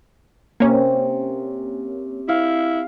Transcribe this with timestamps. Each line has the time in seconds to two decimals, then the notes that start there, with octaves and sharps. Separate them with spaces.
0.60 C3 A#3 C#4
2.29 E4 F5